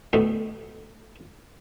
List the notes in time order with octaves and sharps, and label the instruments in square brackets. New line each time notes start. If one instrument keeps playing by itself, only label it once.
[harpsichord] D2 A2 A3 B3